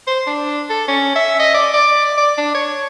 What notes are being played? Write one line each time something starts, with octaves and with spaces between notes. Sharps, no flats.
C5
D4
A4
C#4
E5
D#5
D5
D5
D5
D4
C#5